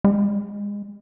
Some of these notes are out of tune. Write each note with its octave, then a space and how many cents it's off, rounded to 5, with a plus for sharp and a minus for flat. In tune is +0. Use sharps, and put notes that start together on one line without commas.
G#3 -25